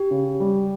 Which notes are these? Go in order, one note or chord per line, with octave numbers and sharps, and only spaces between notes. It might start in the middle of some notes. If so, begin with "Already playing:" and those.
Already playing: G4
C#3
G3